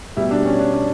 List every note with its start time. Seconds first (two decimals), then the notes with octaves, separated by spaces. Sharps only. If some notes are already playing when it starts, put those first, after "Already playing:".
0.16 B2 G3 E4
0.31 D4
0.45 C#4
0.59 D4
0.73 D4